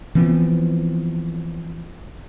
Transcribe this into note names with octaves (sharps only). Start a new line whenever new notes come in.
E3 F3 B3 C4